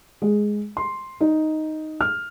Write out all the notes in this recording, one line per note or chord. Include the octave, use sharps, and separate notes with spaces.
G#3
C6
D#4
F6